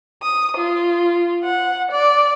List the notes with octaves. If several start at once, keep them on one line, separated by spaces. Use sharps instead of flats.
D#6
F4
F#5
D5